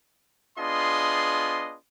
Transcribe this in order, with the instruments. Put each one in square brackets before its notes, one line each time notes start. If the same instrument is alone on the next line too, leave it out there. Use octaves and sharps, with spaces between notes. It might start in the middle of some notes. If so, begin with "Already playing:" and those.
[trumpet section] B3 D4 F4 G#4 D#5 C6